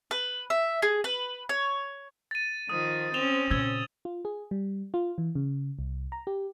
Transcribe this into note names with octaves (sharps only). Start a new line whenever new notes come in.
B4
E5
G#4
B4
C#5
A6 D#7
D#3 F3 D#6
C4 C#4 E7 F7 G7
A#2 C#3 E6 G#6 G7
F4
G#4
G3
F4
E3
C#3
C2
A#5
G4